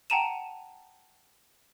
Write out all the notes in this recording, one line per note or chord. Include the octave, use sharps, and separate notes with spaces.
F#5 G5 A5 A#5 D#7 E7